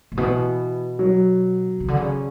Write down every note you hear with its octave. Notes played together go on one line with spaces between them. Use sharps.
A2
B2 E3
F#3
C#3
D3
C#3